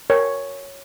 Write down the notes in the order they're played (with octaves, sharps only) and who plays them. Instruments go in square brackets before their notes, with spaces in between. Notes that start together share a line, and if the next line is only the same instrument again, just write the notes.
[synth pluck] A#4 [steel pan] C#5